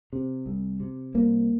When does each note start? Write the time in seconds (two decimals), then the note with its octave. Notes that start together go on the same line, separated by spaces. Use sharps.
0.13 C3
0.46 C2
0.80 C3
1.14 C2 A#3